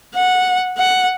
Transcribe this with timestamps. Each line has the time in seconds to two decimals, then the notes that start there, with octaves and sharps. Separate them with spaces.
0.15 F#5
0.77 F#5